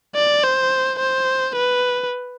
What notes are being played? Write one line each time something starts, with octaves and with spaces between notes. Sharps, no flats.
D5
C5
C5
B4